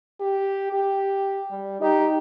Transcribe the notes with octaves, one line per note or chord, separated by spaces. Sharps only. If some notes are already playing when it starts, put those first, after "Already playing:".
G4
G4
G3
D#4 G4